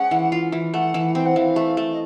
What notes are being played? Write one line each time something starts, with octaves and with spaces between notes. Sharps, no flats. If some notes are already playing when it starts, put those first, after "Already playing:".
Already playing: G#3 C#4 F#5
E3
F4
E3
A3 F#5
E3
C4 G5
F#5
E3 F5
A3
A3
D#5